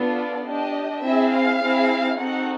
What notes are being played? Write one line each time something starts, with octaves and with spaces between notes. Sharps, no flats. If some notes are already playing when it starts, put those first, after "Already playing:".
Already playing: B3 D4 F4 A4
D5
D4 G4 D#5
C4 E4 G#4 E5
F5
C4 E4 G#4
C4 D#4 F#4 A4 F#5